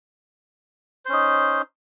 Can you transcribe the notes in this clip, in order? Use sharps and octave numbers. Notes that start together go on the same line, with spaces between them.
C#4 D#4 C5